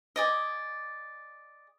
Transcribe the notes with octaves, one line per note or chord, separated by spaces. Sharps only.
G#4 D5 D#5